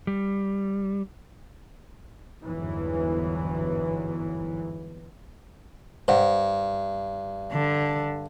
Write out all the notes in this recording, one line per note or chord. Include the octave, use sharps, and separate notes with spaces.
G3
G1 E2 G#2 E3 F#3
G2 C5 D5 F#5
D3